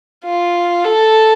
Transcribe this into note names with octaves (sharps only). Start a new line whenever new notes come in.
F4
A4